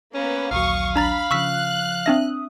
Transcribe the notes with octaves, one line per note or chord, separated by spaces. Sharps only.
A#3 B3 C#4 B4
A#1 D#2 F#3 F5 C#6 D#6
D4 A#5 B5 A6
C#3 F3 C#6 E6 F#6 B6
C4 D4 E5 D#6 A#6